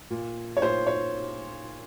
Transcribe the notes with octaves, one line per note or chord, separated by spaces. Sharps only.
A#2
C#5
A#2 C5
C#5